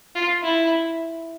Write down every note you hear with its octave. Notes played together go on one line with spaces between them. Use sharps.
F4
E4